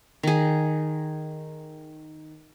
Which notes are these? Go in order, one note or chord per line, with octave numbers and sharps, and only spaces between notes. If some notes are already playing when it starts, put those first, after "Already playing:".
D#3 G#4